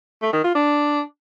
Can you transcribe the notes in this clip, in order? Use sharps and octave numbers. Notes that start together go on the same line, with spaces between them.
A3
D#3
F4
D4